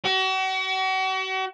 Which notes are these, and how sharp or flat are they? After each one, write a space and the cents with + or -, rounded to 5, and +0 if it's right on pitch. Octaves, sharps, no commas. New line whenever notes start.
F#4 +40